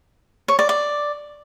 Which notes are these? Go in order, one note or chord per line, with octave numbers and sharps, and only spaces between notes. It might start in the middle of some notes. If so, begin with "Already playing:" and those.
C#5
D5
D5